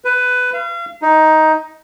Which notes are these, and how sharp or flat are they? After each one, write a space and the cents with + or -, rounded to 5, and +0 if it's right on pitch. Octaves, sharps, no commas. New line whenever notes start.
B4 +15
F5 -35
D#4 +10